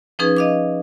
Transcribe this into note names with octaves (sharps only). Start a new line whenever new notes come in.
F3 C#4 D#4 G#4 B4
D#5 F5 D6